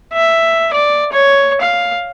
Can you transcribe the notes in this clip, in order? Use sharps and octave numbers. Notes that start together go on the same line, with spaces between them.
E5
D5
C#5
F5